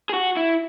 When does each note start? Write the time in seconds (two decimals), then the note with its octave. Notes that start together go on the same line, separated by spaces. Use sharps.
0.09 G#4
0.14 F#4
0.37 E4